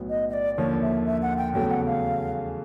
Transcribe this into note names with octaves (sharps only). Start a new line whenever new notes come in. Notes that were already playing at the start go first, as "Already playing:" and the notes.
Already playing: B1 A2 F#3 B3
D#5
D#5
D5
D#2 D3 F3 A#3 C#5
E5
E5
F#5
G5
E2 C#3 F#3 A3 G5
F#5
F5